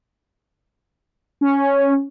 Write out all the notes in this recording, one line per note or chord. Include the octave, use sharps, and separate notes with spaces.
C#4